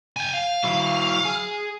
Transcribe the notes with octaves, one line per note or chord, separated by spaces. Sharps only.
G5 G#5
F5
F#3 E4
G#4